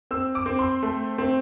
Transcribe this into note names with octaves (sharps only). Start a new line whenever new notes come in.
C4 E6
D6
C4
C6
A3
C4